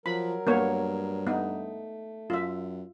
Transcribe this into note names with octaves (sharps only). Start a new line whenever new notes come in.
F3 F#3 A#4 B5
G2 A#3 B3 C#5
A3 B3 D#4
F#2 F4 E5